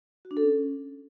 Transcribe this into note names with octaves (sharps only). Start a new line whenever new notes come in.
F#4
D4
A4
C#4